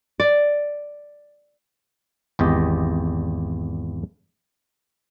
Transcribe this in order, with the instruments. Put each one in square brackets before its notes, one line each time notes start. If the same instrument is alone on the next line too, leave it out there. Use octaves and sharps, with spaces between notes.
[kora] D5
[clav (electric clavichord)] G#1 E2 G4 D#5